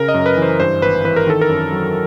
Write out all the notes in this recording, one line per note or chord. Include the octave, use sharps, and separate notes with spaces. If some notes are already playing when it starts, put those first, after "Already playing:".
Already playing: C#3 A#4
D#5
F#2
B4
E3
C5
G2 C5
G#1 B4
E3 B4
A#4
D#3 A4
A#4
F#2
F#3